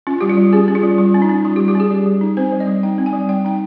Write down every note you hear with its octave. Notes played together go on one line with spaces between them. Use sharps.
C#4 F4
G3 G4
F4
G3
C#4 G#4
C#4
F4
G3
G3 F4
C#4
D#4
C#4
G3 F4
G4
G3
G4
C#4 G#4
G3
G3
D#4
C4 C5
G3
D#5
G3
D#4 G5
C4
G#5
G3
G3 G5
D#4 G5